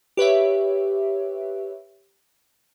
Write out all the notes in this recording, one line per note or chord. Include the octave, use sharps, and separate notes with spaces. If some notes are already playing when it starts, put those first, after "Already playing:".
G4 B4 C#5 E5